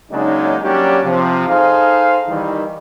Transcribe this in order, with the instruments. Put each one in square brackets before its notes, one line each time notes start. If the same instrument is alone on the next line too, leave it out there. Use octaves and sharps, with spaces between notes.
[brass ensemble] C#3 F#3 G#3 A#3 D4 D#4
F#3 G3 A#3 C#4 D4 G4
C3 F3
D#4 G#4 A4 C5 F5
D#3 E3 G3 D#4